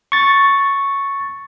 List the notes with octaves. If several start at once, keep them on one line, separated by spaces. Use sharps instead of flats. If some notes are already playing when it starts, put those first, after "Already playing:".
C#6 A6